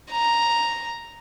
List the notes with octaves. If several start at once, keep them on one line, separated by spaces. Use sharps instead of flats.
A#5